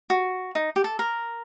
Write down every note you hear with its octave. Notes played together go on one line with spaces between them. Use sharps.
F#4
D#4
G4
A4
A#4